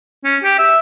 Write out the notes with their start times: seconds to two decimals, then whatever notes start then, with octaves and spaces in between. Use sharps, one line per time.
0.24 C#4
0.44 G4
0.58 E5